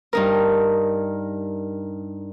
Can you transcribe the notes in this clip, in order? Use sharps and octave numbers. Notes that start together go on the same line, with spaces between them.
G2 D#4 A#4